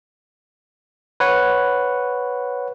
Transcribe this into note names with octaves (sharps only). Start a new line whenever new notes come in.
B4 C#5 F#5